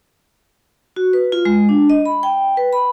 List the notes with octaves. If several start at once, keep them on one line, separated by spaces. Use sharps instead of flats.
F#4
B4
F4
G#3
D4
D#5
B5
G5
B4
B5